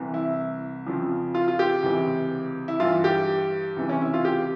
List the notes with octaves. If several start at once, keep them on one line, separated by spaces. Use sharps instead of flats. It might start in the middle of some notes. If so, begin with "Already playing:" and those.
Already playing: C2 C3 E3
E4
F2 C#3 F3
F4
F4
G4
C#2 C3 E3
E4
G2 E3 F4
G4
C#2 C3 E3
C#4
E4
F4
G4